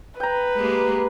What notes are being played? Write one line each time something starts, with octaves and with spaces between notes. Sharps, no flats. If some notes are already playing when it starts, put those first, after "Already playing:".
B4 G5 A#5
G#3 A#3 G4